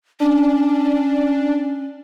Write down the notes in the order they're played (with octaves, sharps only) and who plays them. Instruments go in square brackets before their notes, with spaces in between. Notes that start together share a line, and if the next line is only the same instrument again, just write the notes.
[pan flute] C#4 [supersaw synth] D4